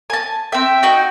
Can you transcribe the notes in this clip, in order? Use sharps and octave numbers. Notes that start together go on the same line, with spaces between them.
G#5 A5
C4 E5 G5
D#4 F#4 G6